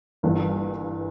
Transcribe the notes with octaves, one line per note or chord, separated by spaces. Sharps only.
G1 G2 E3 A#3